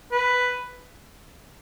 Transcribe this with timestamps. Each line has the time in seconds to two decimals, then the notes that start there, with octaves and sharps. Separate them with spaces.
0.12 B4